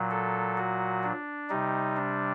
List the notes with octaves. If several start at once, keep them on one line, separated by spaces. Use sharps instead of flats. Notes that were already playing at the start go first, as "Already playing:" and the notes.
Already playing: A#2 F#3
A4
F#4
D4
C3 G3 D#4
D4